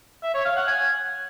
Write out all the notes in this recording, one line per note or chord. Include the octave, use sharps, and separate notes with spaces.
E5
C#5
F5
F#5
G#5